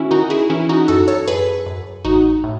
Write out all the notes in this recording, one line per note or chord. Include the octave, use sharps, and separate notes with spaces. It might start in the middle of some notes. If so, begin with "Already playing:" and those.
Already playing: D#3 C#4 E4 F#4
D#3 D#4 F#4
E4 G#4
E3 C#4 E4
D#4 F#4
F#2 F#4 A4
A4 C#5
F#2 G#4 B4
F#2
A1 D#4 F#4
A2